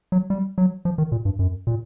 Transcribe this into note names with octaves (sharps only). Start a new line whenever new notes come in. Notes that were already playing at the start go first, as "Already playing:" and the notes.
F#3
G3
F#3
F3
D#3
A#2
G2
F#2
A#2